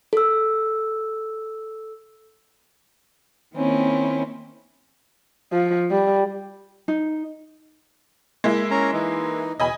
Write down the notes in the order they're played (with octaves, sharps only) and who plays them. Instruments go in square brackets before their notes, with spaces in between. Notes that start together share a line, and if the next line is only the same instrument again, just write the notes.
[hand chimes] A4 E6
[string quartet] D#3 A#3 C4 C#4 E4
[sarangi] F3
G3
[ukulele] D#4
[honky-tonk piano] G#3 A#3 E4
[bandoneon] C#4 A#4 A#5
E3 D#4
[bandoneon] E2 B2 [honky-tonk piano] D#5 G#5 B5